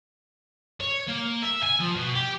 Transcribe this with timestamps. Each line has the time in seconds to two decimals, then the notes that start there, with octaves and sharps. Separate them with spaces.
0.80 C#5
1.08 A#3
1.43 E5
1.64 G#5
1.80 F3
1.96 B2
2.15 G4